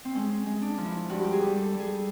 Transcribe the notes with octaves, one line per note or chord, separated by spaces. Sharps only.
C4
G#3 C#4
G#3
D4
F3
E4
G2 F#4
G4
G#4
G3
A4
G3
G#4